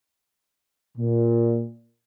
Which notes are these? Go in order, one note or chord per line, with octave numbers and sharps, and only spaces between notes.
A#2